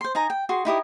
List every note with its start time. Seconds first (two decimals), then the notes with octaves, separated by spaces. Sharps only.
0.01 C5 C6
0.15 D#4 G#5 A#5
0.30 G5
0.49 F#4 G#4 C6
0.65 D#4 E4 G4 D#6